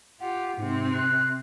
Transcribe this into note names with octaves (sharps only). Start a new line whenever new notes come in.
F4 G4 F#5
G#2 C3 C4
F#6